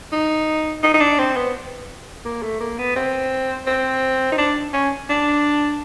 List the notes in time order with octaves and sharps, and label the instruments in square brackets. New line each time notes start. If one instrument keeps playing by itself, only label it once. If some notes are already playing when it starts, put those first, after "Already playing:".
[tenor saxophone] D#4
D#4
D#4
D4
C4
B3
A#3
A3
A#3
B3
C4
C4
D#4
D4
C#4
D4